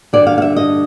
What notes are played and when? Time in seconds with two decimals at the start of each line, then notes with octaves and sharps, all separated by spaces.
0.13 G2 D3 G3 D5
0.27 F5
0.38 F5
0.42 E5
0.56 D#5